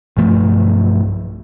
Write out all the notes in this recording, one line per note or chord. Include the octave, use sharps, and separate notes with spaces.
B1 G2 F3 A3